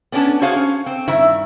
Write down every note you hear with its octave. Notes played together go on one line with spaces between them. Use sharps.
B3 C#4 D4 G4 A5
F#4 G#4 C5 C#5 F5
C#4
C4
G2 D#3 E4 E5